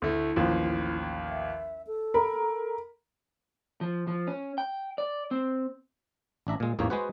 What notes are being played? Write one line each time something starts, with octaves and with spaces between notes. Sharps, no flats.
D2 A3 E4
A1 D#2 F3
E5
A4
A#4 B5
F3
F3
C#4
G5
D5
C4
A1 D4 E5 A#5
A#2 G#3
A1 E2 G#2 A#3 G4 C#5
G#3 F#4 G#4 B4 C5 F#5